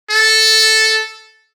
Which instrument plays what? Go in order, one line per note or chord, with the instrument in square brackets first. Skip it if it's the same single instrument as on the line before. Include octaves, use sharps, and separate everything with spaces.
[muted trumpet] A4